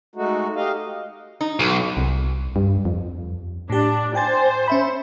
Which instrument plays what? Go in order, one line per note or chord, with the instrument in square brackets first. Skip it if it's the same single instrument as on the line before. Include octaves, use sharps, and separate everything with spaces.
[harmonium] G#3 A3 D#4 F#4
G4 D#5 F5
[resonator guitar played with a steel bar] D#4
[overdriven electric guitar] B1
[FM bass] C2
G2
F2
[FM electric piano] A2 G4 [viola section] D4
[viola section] C5 [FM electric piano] G5 G#5 A6
[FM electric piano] C#4 E5 B5